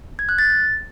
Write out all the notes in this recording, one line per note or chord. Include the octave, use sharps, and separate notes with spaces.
G#6
F#6
A6